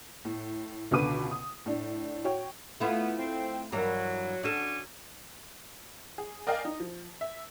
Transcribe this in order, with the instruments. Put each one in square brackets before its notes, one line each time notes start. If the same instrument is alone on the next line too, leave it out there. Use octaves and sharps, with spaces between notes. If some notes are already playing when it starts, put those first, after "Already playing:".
[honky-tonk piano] A2
C#2 B2 D3 B4 D6 D#7
D#6
A2 D4
F#4 C#5 G5
[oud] A3 E4 F4 [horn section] B3
[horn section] C4
[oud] G2 E3 A#4 [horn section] F#3
[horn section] D3 C#4 D4 [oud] F#4 A4
[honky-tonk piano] G#4
A#4 D5 D#5 F5 G5 G#5
D#4
F3
E5